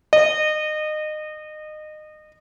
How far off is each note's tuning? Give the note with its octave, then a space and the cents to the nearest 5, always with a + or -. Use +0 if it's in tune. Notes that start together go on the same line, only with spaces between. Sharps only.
D#5 -25